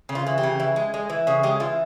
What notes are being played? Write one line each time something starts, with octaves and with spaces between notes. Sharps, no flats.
C#3
F4
E3
G4
C#3
E3
G#3
G#3
E3
C#3 G#4
G#3 G4
E3 F4